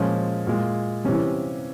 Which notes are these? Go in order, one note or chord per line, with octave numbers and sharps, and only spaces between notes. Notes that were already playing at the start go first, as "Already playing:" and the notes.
Already playing: A#2 F3 G#3 C#4
A#2 G#3
C3 E3 G3 C#4